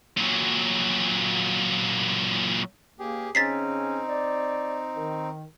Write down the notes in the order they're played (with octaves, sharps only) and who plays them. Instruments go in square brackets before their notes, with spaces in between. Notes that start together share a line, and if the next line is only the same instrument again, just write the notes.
[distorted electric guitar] A#2 F#3
[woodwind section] C#2 A#3 [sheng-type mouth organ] G4 G#4
[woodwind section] C#3 C#4 [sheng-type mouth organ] C4 D#4 [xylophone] A6 B6 C7
[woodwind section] D5
D#3